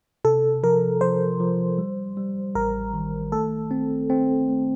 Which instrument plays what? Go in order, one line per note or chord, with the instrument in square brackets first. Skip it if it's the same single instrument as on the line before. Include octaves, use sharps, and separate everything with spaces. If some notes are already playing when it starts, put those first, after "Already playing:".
[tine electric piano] C3 [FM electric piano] A4
[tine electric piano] F3 [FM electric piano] A#4
[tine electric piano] F3 [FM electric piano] C5
[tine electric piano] F3
G3
G3
[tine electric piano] A1 [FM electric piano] A#4
[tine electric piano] D#3
[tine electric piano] A3 [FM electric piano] A4
[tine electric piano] C4
C4
A3